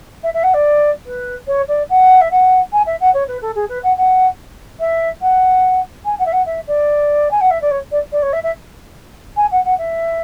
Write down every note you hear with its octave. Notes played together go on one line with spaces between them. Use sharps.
E5
E5
F#5
D5
B4
C#5
D5
F#5
E5
F#5
G#5
E5
F#5
C#5
B4
A4
G#4
B4
F#5
F#5
E5
F#5
G#5
F#5
E5
F#5
E5
D5
G#5
F#5
E5
D5
C#5
D5
D5
C#5
E5
E5
G#5
F#5
F#5
E5